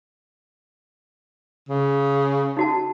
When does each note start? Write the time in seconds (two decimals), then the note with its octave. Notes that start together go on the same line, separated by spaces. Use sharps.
1.69 C#3
2.57 D#4 F#4 A5